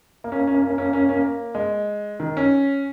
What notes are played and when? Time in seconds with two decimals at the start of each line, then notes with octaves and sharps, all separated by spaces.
0.24 A#3
0.32 C#4
0.39 A#3
0.47 C#4
0.54 A#3
0.62 C#4
0.70 A#3
0.78 C#4
0.86 A#3
0.93 C#4
1.01 A#3
1.09 C#4
1.17 A#3
1.55 G#3
2.20 D#3
2.37 C#4